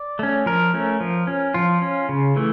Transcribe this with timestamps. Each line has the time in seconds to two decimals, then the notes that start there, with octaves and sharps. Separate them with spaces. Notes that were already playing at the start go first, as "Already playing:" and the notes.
Already playing: D5
0.19 A3 C#4
0.46 F3 A#4
0.74 A3 C#4
1.00 F3
1.27 C#4
1.54 F3 F4
1.82 C#4
2.09 C#3
2.36 E3 A3